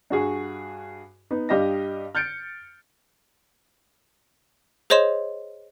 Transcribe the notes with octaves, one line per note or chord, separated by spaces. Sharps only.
G2 F#4 G#4
B3 D#4
G2 G3 G4 D#5 F5 A#6
F6 G6 A6 C#7 D7
G#4 C5 C#5 D#5 C6 E7